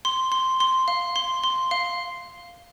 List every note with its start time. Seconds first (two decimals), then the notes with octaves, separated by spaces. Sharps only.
0.05 C6
0.32 C6
0.60 C6
0.88 F5
1.16 C6
1.44 C6
1.71 F5